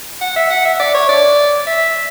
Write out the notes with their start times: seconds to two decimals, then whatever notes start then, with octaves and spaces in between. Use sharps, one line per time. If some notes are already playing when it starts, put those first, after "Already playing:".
0.21 F#5
0.36 E5
0.50 F#5
0.65 E5
0.80 D5
0.94 C#5
1.09 D5
1.67 E5